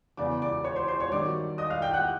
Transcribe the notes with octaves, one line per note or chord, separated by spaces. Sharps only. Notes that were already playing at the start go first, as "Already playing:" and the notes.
E2 C#3 E3 D5 D6
D5 D6
C#5 C#6
C5 C6
C5 C6
C#5 C#6
G2 D#3 F#3 D5 D6
D#5 D#6
F5 F6
G5 G6
F#5 F#6